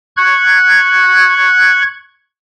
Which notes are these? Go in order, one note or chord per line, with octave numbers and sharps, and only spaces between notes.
C#6 F#6 G#6